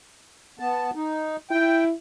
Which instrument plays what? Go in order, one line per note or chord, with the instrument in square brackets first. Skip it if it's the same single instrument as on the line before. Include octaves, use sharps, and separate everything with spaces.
[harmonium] B3 A5
D#4
[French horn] E4 [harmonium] G5